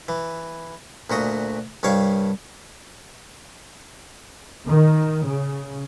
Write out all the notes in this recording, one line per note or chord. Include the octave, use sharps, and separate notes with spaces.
E3
D2 A#2 F#4 D#5
C2 G2 C#5 F5 C#6
D#3
C#3